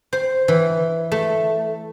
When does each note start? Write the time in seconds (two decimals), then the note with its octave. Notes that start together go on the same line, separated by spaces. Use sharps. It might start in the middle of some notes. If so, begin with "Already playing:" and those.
0.13 C5
0.48 E3
1.12 A3